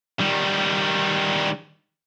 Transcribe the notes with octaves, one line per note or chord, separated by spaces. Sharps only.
D#3 G3